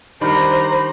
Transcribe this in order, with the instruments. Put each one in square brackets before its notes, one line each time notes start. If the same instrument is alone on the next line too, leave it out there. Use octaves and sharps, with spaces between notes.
[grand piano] D#3 G3 D4 [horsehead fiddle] C5 A#5 [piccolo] B5